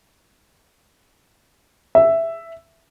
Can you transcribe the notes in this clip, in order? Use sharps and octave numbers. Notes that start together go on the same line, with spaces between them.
E5